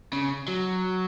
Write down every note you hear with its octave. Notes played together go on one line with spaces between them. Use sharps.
C#3
F#3